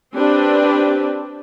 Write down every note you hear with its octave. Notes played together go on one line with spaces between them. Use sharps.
C4 D4 G4 B4